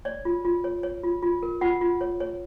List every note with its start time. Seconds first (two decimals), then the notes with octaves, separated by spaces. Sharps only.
0.05 C#5 D5
0.25 F4
0.45 F4
0.64 C#5
0.83 C#5
1.03 F4
1.23 F4
1.43 A#4
1.61 F4 F#5
1.81 F4
2.01 C#5
2.20 C#5